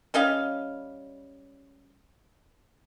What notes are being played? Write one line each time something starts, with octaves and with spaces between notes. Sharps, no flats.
G3 C#4 D#5 F5